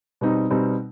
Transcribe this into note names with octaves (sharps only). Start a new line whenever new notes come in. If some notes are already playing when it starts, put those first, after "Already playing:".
B2 G3 C4 D#4
B2 G3 C4 D#4